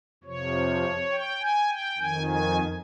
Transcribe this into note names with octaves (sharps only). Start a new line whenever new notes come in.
F2 C3 F3 C#5
G5
G#5
G5
F2 D#3 G#5
G#5